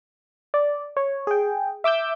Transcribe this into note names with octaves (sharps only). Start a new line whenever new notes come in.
D5
C#5
G#4 G5
E5 D6 E6 G6